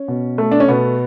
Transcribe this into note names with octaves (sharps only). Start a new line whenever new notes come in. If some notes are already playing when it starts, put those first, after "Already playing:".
Already playing: C#4
B2
A3
D4
C#4
B2 B3